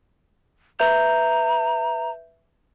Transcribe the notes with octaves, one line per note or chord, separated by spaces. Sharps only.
B4 E5 A#5 G6